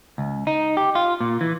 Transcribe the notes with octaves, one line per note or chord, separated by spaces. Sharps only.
C#2
D#4
G4
F4
A#2
E3